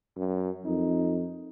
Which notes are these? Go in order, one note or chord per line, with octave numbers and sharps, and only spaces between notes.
F#2
F2 D#4